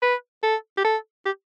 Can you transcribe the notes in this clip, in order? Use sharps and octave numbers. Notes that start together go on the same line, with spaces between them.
B4
A4
G4
A4
G4